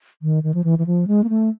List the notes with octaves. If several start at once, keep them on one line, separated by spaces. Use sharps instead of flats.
D#3
D#3
F3
E3
E3
F3
G#3
A#3
A3